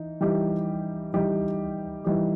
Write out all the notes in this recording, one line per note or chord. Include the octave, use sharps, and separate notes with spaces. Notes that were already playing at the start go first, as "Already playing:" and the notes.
Already playing: E3 D#4
E3 G3 D#4 G4
E3 G3 D#4 G4
E3 G3 D#4 G4